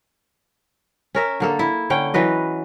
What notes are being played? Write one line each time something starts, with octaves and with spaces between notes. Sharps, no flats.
C#4 A#4 E5
D3 A#3 A4
E4
D3 C#4 G5
E3 F#3 B4 D#5